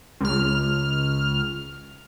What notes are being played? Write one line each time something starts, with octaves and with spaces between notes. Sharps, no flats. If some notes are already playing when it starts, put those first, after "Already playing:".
C#2 F6